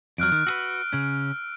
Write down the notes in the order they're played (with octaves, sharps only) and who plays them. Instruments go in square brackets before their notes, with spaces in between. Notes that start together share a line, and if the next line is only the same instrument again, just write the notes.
[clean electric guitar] F2 F#3 [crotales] F6 F#6 D7
[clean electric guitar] D#3
[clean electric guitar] F#4 G#4 B4 [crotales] E6 F6
[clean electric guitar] C#3 C#4